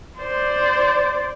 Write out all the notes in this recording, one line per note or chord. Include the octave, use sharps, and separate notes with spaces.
C5 D5